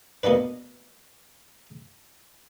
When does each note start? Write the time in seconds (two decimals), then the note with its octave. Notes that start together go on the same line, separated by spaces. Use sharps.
0.23 B2 A#3 B3 D4 B4